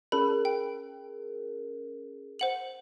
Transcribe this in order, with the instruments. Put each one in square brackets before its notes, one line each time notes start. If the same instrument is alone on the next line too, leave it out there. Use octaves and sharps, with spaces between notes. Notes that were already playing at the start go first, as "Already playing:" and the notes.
[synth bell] C#4 G#4 A#4 [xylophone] B5
[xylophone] G5
C5 F#5 F#7